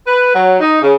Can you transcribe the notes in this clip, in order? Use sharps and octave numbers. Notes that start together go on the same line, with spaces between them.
B4
F#3
D#4
C#3